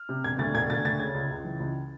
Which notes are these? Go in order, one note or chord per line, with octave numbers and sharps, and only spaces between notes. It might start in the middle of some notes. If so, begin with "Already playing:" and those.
Already playing: F6
C3
E1 G#6
D2 A6
E1 G#6
D2 A6
D2 A6
C#3 G#6
C#2
C#2
E3
C#2